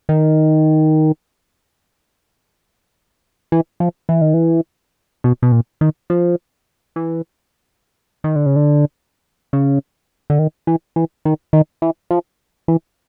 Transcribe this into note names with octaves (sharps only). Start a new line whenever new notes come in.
D#3
E3
F3
E3
D#3
E3
B2
B2
A#2
D#3
F3
E3
D#3
D3
C#3
D3
C#3
D3
D#3
E3
E3
D#3
D#3
E3
F3
E3